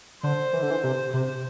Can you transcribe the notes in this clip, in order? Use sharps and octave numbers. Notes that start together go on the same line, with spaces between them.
D3 C5
E3
D3
E3
C3
C3 C5